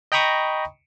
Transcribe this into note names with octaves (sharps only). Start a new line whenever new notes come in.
D#5 G5 A#5 B5 C#6 D#6